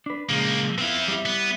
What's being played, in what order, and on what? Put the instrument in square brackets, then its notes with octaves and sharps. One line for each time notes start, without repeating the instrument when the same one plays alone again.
[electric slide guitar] D4 B4
[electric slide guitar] A#2 C#3 G#3 [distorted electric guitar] F3 A#3
[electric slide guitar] B3 E4 [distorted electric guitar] C4 F5
[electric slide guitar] G3 E4
[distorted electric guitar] B3